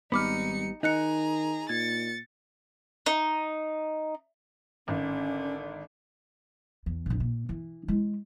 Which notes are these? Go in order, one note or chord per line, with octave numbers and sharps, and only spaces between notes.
G#1 G3 B3 D#4 B5 D6 F6 C#7
D#3 D#4 G#4 D#5 A#5 F#6 C#7
A#2 G#6 A6 C#7
D#4
G#1 D3 C#4
E2
F1 A#1
A#2
E3
G#3 E4